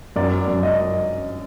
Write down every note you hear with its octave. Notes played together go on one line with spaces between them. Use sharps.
F#2 D5
F#2
D#5